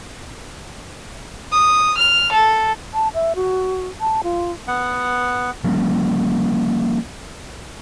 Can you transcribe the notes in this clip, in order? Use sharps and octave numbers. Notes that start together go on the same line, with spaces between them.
D#6
F6
A4
A5
E5
F#4
A5
F4
B3 F#5
F3 G3 A#3 C#4